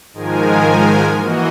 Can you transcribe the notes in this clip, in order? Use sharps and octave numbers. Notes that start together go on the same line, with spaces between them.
G#2 D#3 F3 G#3 A#4 G#5
E3 A#3 F#4 D#5